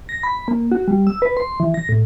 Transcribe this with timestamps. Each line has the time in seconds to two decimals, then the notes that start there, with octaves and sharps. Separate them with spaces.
0.09 A#6
0.23 B5
0.48 A#3
0.71 F#4
0.88 G3
1.07 E6
1.22 B4
1.37 C6
1.60 E3
1.74 A#6
1.89 A2